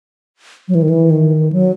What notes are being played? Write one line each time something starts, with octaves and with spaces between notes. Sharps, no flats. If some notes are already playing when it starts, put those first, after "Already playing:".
F#3
E3
D#3
E3
D#3
F#3